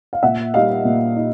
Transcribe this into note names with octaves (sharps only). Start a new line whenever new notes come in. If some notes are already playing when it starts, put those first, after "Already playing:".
F5
A#2 E5 F#5
G3 A#3 D#4 D#5 F5
A#2
D#4